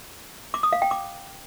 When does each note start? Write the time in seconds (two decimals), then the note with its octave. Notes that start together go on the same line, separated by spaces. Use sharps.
0.54 D6
0.63 D#6
0.73 F5
0.82 G5
0.91 D6